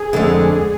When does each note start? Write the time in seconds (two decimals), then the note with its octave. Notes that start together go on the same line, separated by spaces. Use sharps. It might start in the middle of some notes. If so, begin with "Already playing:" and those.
Already playing: G#4
0.13 F2 D3 G#3